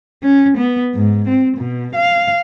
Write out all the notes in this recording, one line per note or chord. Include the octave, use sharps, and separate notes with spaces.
C#4
B3
G#2
C4
B2
F5